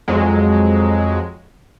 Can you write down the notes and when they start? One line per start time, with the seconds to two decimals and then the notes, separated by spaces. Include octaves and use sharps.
0.08 F2 F#3 G#3